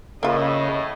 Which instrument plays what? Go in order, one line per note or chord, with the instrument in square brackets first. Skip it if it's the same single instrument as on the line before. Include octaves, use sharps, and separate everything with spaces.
[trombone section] A2 [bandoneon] C#3 [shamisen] A#3 F4 [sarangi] D#5